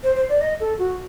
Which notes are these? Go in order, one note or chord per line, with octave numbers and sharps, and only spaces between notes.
C5
C5
D5
D#5
A4
F#4